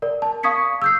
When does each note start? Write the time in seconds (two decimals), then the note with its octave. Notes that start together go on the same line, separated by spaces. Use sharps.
0.02 A#4 D5
0.22 A5
0.43 F5 C#6 D#6 G#6 B6 C#7
0.82 E6 G6 C7